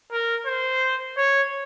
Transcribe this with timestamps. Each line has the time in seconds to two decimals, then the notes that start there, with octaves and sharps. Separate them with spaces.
0.12 A#4
0.47 C5
1.17 C#5